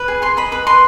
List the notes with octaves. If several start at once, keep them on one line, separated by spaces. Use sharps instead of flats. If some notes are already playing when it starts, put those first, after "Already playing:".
Already playing: B4
G#4
G#4 C6
D#5 B5
B4 B5
B4 C6